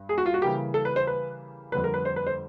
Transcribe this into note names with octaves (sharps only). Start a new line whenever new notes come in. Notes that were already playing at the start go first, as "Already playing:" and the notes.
Already playing: G2
G#4
F#4
F4
F#4
C#3 E3 G3 A#3 G4
A4
B4
C5
B4
F2 D3 G3 B4
A#4
B4
C5
B4
C5